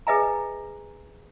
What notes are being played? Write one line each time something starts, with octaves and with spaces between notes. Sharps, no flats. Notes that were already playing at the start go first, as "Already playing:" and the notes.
G#4 B4 D#5 E5 G#5 A#5